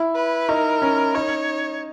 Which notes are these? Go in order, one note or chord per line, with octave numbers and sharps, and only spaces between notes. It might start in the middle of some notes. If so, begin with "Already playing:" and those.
Already playing: E4
B4
D#4 A#4
C#4
D#4 C#5